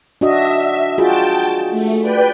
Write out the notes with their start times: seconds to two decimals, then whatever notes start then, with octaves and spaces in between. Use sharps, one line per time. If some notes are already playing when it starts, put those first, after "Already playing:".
0.21 D4 F#4 D#5 E5
0.98 F4 F#4 G#4 G5 A5
1.70 A3
2.02 B4 D5 G5